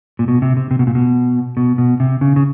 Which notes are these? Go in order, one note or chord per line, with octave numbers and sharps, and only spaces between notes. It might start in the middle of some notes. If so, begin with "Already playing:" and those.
A#2
B2
C3
C3
C3
B2
A#2
B2
B2
B2
C3
C#3
C#3